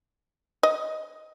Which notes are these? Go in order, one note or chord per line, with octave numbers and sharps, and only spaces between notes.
D#5